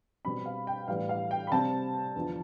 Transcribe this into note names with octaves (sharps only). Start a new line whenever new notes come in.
B2 G3 C4 B5
F5
G5
A2 E3 G3 F5
F5
G5
B5
C3 G3 C4 A5
E2 D3 F3